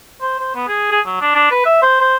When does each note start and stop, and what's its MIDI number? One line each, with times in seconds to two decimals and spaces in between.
0.22 0.36 72
0.40 0.54 72
0.55 0.65 59
0.68 0.89 68
0.91 1.00 68
1.06 1.18 54
1.21 1.32 62
1.35 1.49 62
1.51 1.61 71
1.65 1.79 76
1.82 1.96 72
2.00 2.16 72